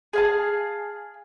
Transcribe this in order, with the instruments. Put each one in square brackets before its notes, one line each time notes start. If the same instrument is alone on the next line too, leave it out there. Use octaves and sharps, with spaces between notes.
[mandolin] G#4 F5 A5